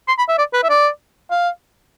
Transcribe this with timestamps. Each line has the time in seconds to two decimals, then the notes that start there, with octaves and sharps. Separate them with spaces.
0.08 C6
0.19 B5
0.29 E5
0.38 D5
0.54 B4
0.64 E5
0.70 D5
1.31 F5